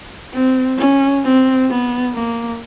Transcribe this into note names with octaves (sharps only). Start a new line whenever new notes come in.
C4
C#4
C4
B3
A#3